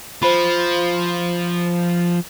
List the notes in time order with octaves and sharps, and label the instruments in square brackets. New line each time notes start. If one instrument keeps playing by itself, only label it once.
[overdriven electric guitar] F3 [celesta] C5 B5